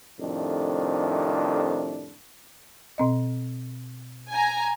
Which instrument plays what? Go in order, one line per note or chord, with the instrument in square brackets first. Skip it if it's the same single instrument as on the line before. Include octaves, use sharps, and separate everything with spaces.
[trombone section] F2 A2 C3 D#3 D4
[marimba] B2 C4 D#5
[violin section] G#5 A#5